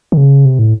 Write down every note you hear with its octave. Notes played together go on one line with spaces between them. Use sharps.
D#3
C#3
C3
A2